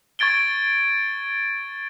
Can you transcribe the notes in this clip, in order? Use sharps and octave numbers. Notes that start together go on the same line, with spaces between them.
C#6 G#6 A6 D7 G7